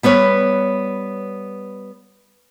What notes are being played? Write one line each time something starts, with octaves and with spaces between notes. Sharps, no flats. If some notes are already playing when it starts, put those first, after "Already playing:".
G3 B3 B4 C#5